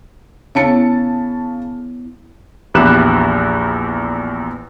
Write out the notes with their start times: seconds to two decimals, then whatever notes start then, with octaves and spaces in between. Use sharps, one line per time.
0.55 C#3 B3 E4 C#5 A5 C#7
2.74 A#1 E2 G4 B5 F#6 E7